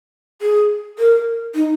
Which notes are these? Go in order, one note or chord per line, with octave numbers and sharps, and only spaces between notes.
G#4
A#4
D#4